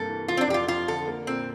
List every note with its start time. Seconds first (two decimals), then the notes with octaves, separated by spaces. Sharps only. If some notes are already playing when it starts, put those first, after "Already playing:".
Already playing: G2 C3 G3 A#3 A4
0.08 E3
0.28 F3 F4
0.37 C4
0.41 D4
0.48 F2 G4
0.54 F4
0.68 F2 F4
0.88 D3 A4
1.07 A#3
1.27 A#2 C4